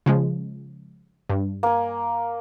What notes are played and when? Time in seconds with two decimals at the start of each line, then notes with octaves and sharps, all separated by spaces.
0.06 C#3 F3 G#3
1.30 G2
1.63 A#3 G#5